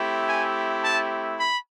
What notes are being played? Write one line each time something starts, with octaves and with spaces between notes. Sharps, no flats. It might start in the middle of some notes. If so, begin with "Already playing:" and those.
Already playing: A3 C4 E4 G4
G#5
A5
B5